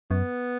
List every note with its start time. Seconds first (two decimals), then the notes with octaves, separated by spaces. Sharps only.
0.11 F#2 B3